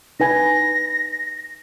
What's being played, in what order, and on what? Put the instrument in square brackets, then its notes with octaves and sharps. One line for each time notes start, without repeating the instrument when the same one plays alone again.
[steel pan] D#4 B4 G#5 [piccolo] A#6